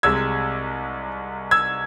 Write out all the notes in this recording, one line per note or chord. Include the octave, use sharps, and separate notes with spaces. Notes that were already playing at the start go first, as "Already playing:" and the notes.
C2 C3 G#3 E6 G#6
E6 G#6